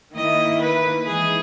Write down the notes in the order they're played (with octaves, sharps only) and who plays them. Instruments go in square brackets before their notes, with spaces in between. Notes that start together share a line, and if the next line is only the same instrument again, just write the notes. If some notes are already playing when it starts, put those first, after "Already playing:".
[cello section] D#3 A#3 E4 [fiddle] D#5
[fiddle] B4
[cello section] E3 G#3 D#4 [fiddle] G#4